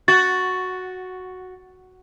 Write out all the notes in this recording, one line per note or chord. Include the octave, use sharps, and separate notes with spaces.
F#4 A6